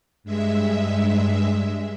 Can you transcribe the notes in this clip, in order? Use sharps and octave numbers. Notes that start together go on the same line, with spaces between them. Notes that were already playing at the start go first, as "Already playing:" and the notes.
G2 G#3 E5